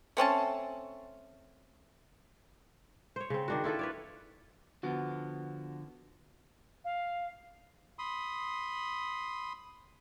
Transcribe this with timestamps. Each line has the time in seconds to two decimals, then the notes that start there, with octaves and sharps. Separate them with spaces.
0.17 A3 C4 C#4 A5
3.16 C5 C#5
3.30 C#3 C4
3.48 D#3 D4 F#4
3.64 E4 F4 A4 B4
3.79 B4 C#5 D5
4.83 D3 F3 B3 F#4
6.84 F5
7.99 B5 C6 D#6